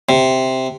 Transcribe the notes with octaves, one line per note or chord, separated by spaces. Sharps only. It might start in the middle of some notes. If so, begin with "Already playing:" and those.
C3